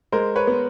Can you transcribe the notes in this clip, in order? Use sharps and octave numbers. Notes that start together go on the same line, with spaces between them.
G#3 A#4 C5
B4 C#5
B3